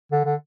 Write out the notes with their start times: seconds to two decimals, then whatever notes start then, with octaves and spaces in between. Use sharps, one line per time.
0.12 D3
0.25 D3